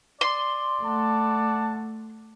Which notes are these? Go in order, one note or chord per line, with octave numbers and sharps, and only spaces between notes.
D5 C6
A3 F#5 A5